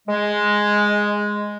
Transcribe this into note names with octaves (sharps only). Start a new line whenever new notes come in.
G#3